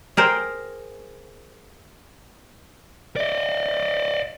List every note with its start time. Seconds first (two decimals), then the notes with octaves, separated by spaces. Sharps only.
0.17 G#4 A#4 C5 G5
3.16 D5 D#5